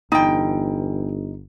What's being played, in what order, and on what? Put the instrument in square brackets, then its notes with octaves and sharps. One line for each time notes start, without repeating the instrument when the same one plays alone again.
[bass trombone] G1 [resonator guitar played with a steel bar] E2 G5 [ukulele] D#4